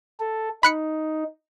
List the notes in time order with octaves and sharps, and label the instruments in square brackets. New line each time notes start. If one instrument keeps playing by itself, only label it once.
[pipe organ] A4
[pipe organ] D#4 [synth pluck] B5 F#6 C#7